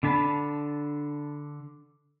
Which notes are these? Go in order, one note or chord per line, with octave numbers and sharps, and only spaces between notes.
D3 D4 A5 B5